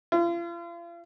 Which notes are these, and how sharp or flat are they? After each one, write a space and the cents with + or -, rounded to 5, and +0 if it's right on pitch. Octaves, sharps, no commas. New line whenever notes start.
F4 -40